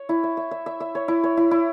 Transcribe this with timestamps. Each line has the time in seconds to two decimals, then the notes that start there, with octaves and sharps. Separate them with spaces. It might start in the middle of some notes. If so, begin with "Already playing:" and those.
Already playing: C#5
0.09 E4
0.23 E5
0.37 E5
0.51 E5
0.66 E5
0.80 E5
0.95 C#5
1.08 E4
1.24 C#5
1.37 E4
1.51 E4